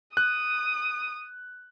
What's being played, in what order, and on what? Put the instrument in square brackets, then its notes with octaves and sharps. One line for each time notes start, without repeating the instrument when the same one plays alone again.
[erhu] D#6 [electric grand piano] F#6